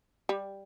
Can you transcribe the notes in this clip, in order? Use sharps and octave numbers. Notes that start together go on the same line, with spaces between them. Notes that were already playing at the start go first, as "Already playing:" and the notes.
G3